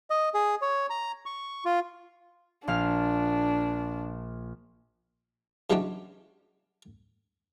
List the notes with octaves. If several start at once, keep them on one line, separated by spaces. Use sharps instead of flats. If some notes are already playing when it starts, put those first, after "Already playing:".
D#5
G#4
C#5
A#5
C#6
F4
A#1 D4 F5 F6
C#3 E3 F#3 G#3 C#4 D4